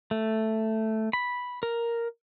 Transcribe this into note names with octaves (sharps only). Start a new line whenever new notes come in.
A3
B5
A#4